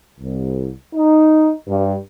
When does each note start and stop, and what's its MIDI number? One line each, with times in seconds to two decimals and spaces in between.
0.21 0.70 36
0.93 1.51 63
1.68 1.93 43